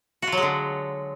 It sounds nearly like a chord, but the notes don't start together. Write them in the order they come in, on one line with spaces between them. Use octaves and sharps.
F#4 F4 F#3 G#3 D3